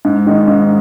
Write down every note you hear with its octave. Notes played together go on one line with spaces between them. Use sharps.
G#2
D#3 G#3 D#4
G#2